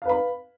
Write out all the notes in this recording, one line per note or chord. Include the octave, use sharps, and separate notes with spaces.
B4 F5 B5